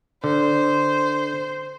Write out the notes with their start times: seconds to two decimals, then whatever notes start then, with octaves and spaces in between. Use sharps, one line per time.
0.24 D3 C5